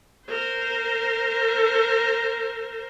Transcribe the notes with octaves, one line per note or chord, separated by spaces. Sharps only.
A#4 C5